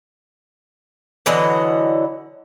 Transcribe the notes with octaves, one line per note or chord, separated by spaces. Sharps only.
D3 E3 F#3 D#5